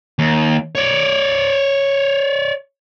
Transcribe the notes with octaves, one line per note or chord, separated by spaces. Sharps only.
D#2
C#5 D5